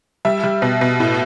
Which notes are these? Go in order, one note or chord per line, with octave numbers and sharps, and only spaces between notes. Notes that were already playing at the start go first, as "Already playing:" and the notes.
G3 E5
G3
B2
B2
A2